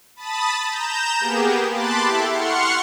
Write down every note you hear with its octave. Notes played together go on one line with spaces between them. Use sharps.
A5 B5 D#6 A6
A#5 G6 E7
A#3 B3 G4 G#4
A5 B5 C6 D6 F#6 A6
E4 G4 A4 E5
F#5 C6 C#6 F6 C#7